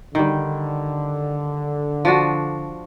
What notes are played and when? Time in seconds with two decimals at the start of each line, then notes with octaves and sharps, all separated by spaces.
0.15 D3 D#3 G3
2.05 F3 D4 F#4